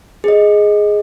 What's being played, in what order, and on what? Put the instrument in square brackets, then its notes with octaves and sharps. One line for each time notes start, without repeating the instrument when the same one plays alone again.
[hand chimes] G#4 D#5